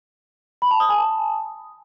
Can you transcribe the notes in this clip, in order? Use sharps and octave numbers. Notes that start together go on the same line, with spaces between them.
B5
A5
D#6
G#5
A5